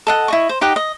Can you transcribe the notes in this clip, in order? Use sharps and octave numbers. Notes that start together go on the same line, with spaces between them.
A4 D#5 F#5
E4 D#5 C#6
C5
D#4 G4 D#5 F#5
D#5